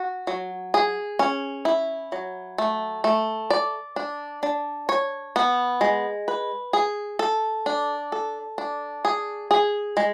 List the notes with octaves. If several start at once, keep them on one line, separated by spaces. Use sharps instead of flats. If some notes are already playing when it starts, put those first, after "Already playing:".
Already playing: F#4
F#3
G#4
C#4
E4
F#3
A3
A3
D5
D4
D4
C#5
B3
G#3
B4
G#4
A4
D4
A4
D4
G#4
G#4
G#3